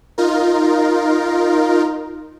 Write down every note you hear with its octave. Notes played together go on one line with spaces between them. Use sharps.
D#4 F4 A#4